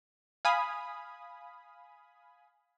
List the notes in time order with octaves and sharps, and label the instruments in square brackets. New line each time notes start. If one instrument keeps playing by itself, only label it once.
[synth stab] F5 G#5 B5 D#6